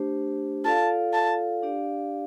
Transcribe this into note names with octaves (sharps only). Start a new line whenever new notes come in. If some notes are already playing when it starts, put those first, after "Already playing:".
Already playing: A3 D4 G4 C5
F4 A4 D5 F5 A5
A5
D4 G4 D5 F5